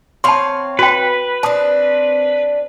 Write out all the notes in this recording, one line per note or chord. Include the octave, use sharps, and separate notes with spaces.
C4 C#5 F5 A5 B5 C6
F#4 B4 G5
C4 D4 A5 D#6